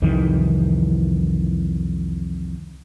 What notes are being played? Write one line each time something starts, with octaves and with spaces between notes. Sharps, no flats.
C2 F2 D#3 E3